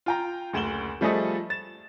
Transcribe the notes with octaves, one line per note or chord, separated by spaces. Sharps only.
F4 G5 A#5
F#1 D2 E7 F#7 G7
F3 G3 A3 G#4 A4 D#5
A6 E7